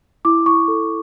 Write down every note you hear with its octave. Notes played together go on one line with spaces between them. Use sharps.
E4 D6
E4 C#6
A4